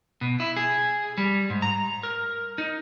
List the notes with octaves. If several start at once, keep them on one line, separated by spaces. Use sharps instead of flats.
B2
E4
G#4
G3
G#2
A#5
A#4
D#4